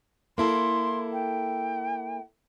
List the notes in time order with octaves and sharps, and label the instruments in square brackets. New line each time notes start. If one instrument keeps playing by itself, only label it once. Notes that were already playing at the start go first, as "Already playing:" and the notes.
[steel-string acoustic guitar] A#3 E4 A4 [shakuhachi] C6
[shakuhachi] G5